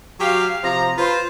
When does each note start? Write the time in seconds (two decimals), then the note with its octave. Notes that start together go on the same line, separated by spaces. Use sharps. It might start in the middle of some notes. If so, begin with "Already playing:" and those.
0.20 F#3 G4 F5
0.64 C3 F3 A#5
0.98 F4 B4 C5